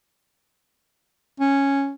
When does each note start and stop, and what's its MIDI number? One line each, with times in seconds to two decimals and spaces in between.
1.40 1.93 61